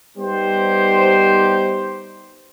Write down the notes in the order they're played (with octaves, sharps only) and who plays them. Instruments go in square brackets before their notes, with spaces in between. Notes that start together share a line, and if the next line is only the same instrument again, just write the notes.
[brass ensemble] G3 B3 D#4 G4 C5